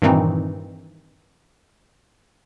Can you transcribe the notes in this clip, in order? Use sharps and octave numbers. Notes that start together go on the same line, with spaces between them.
G2 A#2 D#3 E3 C4 D#4